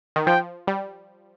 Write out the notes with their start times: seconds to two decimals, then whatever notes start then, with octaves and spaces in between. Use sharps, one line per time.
0.16 D#3
0.27 F3 G5
0.67 G3